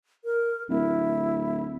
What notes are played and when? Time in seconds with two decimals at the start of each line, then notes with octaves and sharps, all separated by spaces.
0.25 A#4
0.69 D1 E4